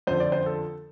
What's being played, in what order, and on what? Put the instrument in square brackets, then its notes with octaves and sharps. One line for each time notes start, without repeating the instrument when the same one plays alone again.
[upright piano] F2 D3 C5
D5
C5
A4